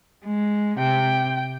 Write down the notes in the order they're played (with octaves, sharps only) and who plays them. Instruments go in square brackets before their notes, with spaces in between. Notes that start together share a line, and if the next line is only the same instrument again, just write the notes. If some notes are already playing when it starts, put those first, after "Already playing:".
[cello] G#3
[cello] C3 [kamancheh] G5